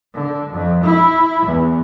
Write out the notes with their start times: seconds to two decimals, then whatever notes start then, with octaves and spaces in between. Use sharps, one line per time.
0.14 D3
0.52 F2
0.83 E4
1.46 E2